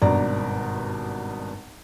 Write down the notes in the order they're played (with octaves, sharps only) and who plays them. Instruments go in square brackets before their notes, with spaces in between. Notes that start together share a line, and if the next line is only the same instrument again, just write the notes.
[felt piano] G#1 G2 B2 D5 A#5